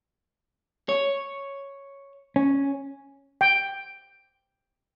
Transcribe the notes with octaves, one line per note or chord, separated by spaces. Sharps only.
C#5
C#4
G5